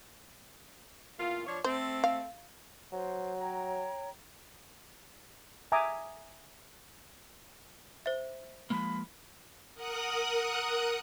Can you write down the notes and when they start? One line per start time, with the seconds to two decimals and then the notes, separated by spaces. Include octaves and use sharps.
1.18 E2 A#3 F4
1.46 F3 D4 C#5
1.64 A3 C4 C5
2.04 F5
2.92 F#3 C5
3.38 C#5 G5 A#5
5.72 E5 G#5 A#5 D6 D#6
8.06 C5 E5
8.70 F3 G#3 A#3 B5
9.74 A#4 F#5 D#6 F#6